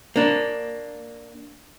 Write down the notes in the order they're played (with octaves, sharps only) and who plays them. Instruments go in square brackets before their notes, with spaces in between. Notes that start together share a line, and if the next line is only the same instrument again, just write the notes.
[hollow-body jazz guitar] A#3 D4